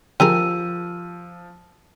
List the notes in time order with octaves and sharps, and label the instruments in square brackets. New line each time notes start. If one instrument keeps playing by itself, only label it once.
[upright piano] F3 [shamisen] G4 G#4 A#4 [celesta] E6 D#7